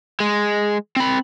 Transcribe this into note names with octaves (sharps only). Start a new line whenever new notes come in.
G#3
C4 B5